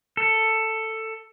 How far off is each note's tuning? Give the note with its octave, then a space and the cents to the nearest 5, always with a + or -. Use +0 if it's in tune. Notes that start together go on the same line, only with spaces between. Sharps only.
A4 +10